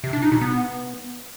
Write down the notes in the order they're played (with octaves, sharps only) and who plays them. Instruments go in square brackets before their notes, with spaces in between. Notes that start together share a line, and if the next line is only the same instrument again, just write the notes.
[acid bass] C3
D4
D#4
B2
B3